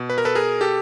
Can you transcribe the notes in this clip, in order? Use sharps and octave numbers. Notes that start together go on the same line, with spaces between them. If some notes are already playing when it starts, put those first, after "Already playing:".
Already playing: B2
B4
A#4
A4 B4
G#4 A#4
G4 A4